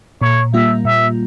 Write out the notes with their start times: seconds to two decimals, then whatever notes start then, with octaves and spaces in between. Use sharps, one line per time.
0.22 A#2 C#5
0.53 G3 A#3 F4 E5
0.85 A#2 E5